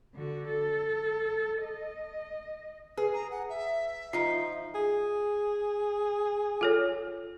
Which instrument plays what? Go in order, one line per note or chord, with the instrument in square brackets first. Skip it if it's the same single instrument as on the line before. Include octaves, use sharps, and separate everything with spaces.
[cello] D3 F#4
A4
D#5
[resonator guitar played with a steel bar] G#4 [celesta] B4
[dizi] A#5
F#5
E5
[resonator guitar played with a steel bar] F3 D#4 [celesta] F4 C7
[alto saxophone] G#4
[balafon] F4 A4 C#5